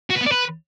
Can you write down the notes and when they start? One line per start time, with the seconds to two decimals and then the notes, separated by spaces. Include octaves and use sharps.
0.10 F#4
0.16 B4
0.21 B3
0.26 D5
0.32 B4